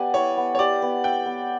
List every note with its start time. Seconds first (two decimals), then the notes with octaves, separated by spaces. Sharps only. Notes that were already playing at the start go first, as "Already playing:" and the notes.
Already playing: B3 G4 D5 G#5
0.14 E4 C#5
0.37 B3
0.55 C#5
0.59 G4 D5
0.82 B3
1.04 E4 G5
1.26 B3